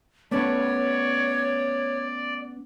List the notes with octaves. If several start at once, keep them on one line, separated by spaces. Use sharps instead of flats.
A3 B3 C#4 C#5 D5